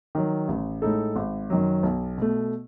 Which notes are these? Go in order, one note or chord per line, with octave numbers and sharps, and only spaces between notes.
D#3 F#3
A1
A2 G#3 D#4 A4
G#1
F#2 D#3 F#3
B1
B2 A3